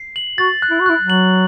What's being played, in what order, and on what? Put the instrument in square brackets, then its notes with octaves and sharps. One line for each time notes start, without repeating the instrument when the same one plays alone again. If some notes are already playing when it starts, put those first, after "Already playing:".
Already playing: [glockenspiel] C7
F#7
[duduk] F#4 [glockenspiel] A6
[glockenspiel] F#6
[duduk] E4
F#4
[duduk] E4 [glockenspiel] F#6
[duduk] F#3
[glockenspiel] F#7